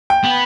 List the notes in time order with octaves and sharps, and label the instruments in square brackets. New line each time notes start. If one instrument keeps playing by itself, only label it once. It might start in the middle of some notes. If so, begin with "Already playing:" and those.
[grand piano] G5
[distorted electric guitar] B3